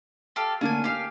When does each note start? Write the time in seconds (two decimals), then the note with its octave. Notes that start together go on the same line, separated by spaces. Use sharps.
0.36 G4 A4 F5
0.61 D3 A3 A#3 C#4 D4 G#5
0.84 G4 F5 G#5 D6